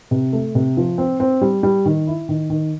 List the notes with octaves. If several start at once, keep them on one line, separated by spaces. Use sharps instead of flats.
C3
A3
C3
F3
C4
C4
G3
G3
D#3
E4
D#3
D#3